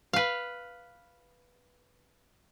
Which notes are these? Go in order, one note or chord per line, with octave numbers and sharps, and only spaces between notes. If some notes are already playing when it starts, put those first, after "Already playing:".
B4 F5